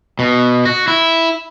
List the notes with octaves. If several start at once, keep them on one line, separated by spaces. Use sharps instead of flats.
B2
F#4
E4